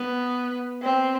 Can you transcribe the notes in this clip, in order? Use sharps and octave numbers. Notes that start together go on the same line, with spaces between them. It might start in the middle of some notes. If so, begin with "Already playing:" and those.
Already playing: B3
C4